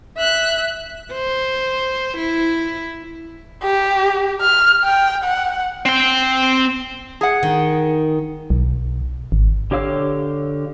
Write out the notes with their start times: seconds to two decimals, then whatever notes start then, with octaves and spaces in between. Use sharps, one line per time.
0.17 E5 F#6
1.13 C5
2.18 E4
3.63 G4
4.41 F6
4.84 G5
5.24 F#5
5.86 C4 G5
7.21 G#4 F#5
7.43 D#3
8.50 B1
9.32 G#1
9.71 D3 G4 C#5 F5 E6